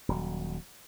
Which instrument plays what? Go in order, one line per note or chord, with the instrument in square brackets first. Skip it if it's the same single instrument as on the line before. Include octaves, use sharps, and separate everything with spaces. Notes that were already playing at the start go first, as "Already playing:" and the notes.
[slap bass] D#1 F#3